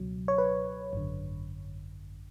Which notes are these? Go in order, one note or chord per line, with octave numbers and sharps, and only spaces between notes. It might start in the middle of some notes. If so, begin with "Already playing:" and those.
Already playing: C#2 B2 F#3
C#5
B4
G#1 F#2 D3